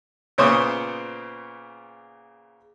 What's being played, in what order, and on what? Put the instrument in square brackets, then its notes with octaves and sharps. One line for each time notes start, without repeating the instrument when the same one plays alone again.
[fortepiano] A#2 C#3 B3 C5 C#6 D#6